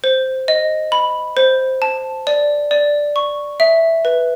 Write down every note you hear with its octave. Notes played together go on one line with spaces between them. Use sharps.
C5
D#5
B5
C5
A5
D5
D5
C#6
E5
B4